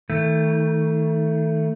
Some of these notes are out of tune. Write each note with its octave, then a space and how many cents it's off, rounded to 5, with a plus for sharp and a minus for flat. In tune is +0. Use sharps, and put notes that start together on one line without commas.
D#3 +40 A3 +15